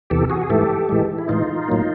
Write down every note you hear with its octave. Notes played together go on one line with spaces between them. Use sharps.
E2 C3 E3 G4 A4
F#4 G#4
G#4
G#2 E3 A3 G4 A4
A2 E3 G#3
E4
A2 E3 G#3 D#4 F4
A2 F#3 A#3